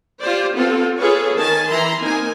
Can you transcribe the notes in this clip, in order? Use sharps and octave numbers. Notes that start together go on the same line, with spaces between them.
F4 G4 C5 D5
B3 C4 F4 A4
F4 G#4 A4 B4 C#5
D#3 G#5 A5
E3 E4 A#5 C6
A#3 C4 D#4 G#5